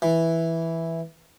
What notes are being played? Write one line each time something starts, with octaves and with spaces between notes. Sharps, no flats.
E3